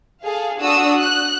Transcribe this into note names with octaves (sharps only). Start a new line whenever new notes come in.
G#4 A4 F5
D4 F#4 D#6 E6
F#6